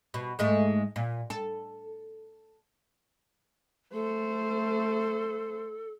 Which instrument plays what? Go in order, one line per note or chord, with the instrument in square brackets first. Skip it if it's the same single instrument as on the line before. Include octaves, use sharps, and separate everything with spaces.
[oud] B2
G#2 G#3 A3
A#2
A4
[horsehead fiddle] A3 C5 [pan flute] A4